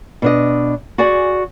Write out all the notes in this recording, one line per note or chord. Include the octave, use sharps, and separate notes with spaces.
B2 D4 D#5
F#4 G#4 D5 G#5